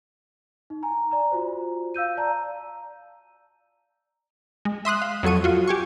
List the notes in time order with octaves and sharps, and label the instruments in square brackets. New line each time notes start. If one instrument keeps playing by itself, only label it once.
[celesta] D#4
G#5 A#5
D5 A#5
F4 F#4 C5
F5 E6 G6 D#7
D5 A5 A#5
[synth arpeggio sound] G#3
E5 C6 D#6 F#6
F5
F2 F#3 A4 C#6 D#7
F4 F#4
G4 G#5 C#6